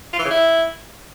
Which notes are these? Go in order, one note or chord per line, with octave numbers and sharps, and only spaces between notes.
F4
E3
C#3
E4